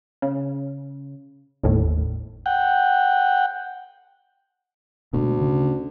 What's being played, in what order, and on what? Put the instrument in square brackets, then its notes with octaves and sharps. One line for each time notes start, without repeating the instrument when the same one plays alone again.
[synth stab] C#3
G1 D#2 A2
[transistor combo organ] F#5 G5
[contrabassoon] D2 [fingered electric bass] G#2 B2
[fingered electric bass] C#3